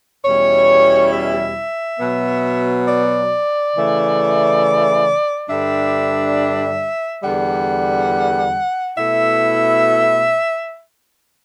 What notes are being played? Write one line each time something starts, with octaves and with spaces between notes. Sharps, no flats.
E2 B2 G3 C#4 E4 C#5
E5
B2 F#3 B3
D5
C#3 E3 A3
G2 D3 G3 D4 E5
E2 D3 G3 F#5
B2 A3 E4 E5